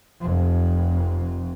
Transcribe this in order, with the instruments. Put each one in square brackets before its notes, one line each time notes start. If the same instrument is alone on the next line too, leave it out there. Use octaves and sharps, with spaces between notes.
[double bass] F1 F2